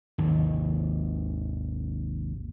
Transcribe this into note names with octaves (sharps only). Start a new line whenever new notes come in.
G#1 D#2